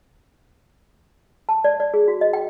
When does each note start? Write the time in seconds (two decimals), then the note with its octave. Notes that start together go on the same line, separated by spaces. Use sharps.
1.49 A5
1.64 D5
1.80 D5
1.94 G#4
2.08 F#4
2.21 D#5
2.33 G5